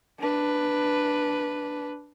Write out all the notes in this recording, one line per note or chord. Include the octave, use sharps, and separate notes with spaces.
D4 B4